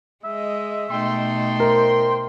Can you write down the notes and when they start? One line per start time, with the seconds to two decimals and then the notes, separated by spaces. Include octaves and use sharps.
0.25 G#3 D#5 E5
0.90 B2 A3 D#4 G5 C6
1.60 A#4 C5